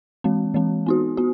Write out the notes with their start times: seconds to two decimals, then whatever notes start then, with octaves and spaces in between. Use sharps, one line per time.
0.24 E3 G#3 C4
0.54 E3 G#3 C4
0.87 B3 D#4 F#4
1.17 B3 F#4